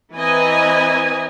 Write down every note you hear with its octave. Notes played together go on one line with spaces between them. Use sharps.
E3 C4 B4 D#5 G#5 A#5